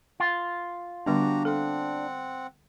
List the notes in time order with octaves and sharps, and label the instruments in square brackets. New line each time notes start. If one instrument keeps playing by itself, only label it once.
[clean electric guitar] F4
[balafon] D3 G3 B3 [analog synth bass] D4 [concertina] F#4 G4 A#5
[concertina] C4 F#5 [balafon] A4